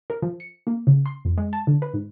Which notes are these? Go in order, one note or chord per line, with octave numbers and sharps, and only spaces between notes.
A#4
F3
C#7
A#3
C#3
C6
F2
G#3
A5
D3
B4
G#2